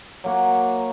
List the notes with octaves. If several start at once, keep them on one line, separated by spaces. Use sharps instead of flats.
F#3 A#3 F#4